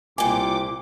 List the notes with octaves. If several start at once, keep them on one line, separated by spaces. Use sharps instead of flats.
C2 A#2 G4 G#5 D6